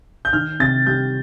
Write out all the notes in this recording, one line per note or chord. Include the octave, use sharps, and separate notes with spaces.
G6
D#3 F6
C3 A6
G3 G6